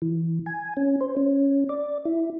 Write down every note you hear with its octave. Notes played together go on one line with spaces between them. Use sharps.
E3
G#5
C#4
C5
C#4
D5
E4